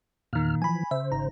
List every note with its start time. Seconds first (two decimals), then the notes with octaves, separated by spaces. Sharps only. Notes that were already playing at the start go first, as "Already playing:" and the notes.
0.33 E2 A#2 D#3 F6
0.62 E3 F3 G#5 B5
0.91 C#3 C5 E5
1.12 G#1 A#5